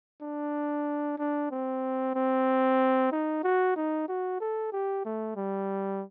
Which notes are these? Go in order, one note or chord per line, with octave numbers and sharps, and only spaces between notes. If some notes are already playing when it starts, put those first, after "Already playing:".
D4
D4
C4
C4
D#4
F#4
D#4
F#4
A4
G4
A3
G3